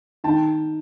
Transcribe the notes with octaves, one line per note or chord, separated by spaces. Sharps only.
D#3 G5 A5